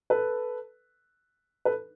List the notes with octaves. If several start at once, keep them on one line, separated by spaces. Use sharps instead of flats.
A4 B4
A4 B4